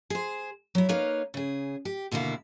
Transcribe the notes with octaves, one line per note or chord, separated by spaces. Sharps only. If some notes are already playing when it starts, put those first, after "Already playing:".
G#4 C5
F#3 E4
A#3 D#4 B4 C#5 F5
C#3 G#4
G4
D#2 B2 D3 A#3 E4 F5